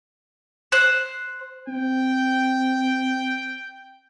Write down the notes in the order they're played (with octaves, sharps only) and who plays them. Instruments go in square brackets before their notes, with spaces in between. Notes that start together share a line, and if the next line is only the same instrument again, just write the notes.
[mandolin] C5 F#6
[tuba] C4 [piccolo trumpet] G5